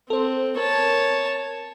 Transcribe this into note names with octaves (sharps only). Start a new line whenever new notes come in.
C4 A4 C5
A#4 C#5 A5